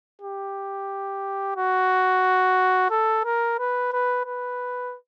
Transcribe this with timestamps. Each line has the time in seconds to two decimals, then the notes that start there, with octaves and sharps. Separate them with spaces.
0.22 G4
1.56 F#4
2.90 A4
3.24 A#4
3.59 B4
3.93 B4
4.26 B4